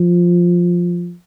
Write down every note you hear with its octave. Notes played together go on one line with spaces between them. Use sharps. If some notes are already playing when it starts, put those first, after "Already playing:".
Already playing: F3